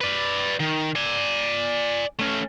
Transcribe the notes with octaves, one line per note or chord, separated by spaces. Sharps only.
B4 D5
D#3
D5 G#5
A3 C#4